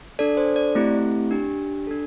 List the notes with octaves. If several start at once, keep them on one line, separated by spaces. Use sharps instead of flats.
D4 A4 D5
C5
D5
A3 C4 E4 G4
D4 G4
D4 A4